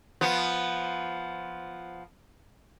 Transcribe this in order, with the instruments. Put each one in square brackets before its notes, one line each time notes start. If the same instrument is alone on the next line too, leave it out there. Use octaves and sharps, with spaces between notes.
[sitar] F3 B3